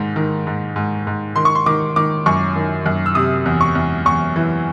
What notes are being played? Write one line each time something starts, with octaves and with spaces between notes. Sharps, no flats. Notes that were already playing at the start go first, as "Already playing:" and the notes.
Already playing: G#2 D#3
D#3
G#2
G#2
G#2
D#3 C6
C#6
C6
D#3 D6
D#3 D6
F#2 C#6
D#3
F#2
E6
C3 D#6
E2
C#6
E2
E2 C#6
E3